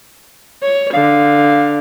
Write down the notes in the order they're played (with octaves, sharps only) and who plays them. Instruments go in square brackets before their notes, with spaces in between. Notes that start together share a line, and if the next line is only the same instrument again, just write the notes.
[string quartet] C#5
[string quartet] D3 [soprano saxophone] F5